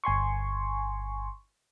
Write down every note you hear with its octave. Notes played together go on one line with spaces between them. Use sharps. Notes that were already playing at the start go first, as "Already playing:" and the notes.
G1 G#5 C6 C#6